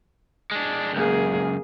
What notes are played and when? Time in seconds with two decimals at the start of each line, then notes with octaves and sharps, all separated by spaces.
0.51 G#3 D4
0.93 C#2 F#2 A#3 G#4